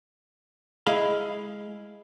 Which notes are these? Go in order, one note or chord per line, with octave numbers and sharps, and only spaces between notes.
G#3 E4 G#4 D#5 F5 B5